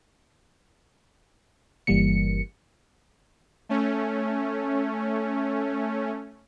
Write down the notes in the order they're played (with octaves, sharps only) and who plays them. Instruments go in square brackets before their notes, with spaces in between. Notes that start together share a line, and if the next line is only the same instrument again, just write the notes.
[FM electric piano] G1 E3 G3 A#3 C#7
[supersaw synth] A3 C#4